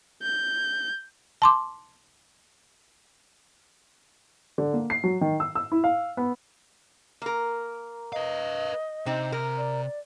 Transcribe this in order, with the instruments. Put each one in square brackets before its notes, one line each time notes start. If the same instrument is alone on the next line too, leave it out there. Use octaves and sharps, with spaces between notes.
[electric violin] G6
[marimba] A5 C6 D6
[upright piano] D3
A#3
C7
F#3
D#3
E6
E6
E4
F5
B3
[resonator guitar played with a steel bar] A#3 A#4
[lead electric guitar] B4 F5 [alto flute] D#5
[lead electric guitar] C3 [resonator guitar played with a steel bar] C4 D#4
[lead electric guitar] C3 [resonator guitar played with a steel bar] A#4
[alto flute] D5